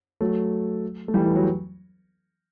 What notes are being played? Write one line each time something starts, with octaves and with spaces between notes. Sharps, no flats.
F#3 A3
A3
E3 G3
E3
F#3